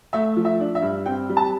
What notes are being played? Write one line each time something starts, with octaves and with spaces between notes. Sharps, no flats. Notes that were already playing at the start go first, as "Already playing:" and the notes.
A3 E5
F3
E5
D4
E5
G2
C4 G5
G3
A5